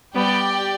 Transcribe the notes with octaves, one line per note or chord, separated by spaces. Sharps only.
G3 B3 G4 D5 G5